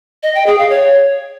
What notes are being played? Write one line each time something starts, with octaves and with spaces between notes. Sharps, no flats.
D#5
G5
G#4
F5
C#5